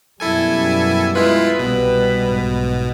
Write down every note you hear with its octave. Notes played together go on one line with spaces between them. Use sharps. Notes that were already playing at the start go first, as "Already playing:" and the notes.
F#2 B2 G3 E4 A4 G#5
G#3 E4 F4 B4
C2 B2 G3
B1 G#2